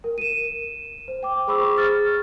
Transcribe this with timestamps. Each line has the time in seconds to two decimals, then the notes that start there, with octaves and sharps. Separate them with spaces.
0.04 A#4
0.18 D#7 E7
1.08 C5
1.23 G5 D6
1.47 G#4 C5 B5 C#6 D6 E6
1.77 G#4 F6 A6